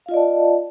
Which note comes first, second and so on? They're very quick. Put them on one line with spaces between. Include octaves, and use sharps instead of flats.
F5 F4 D#5 D5 A5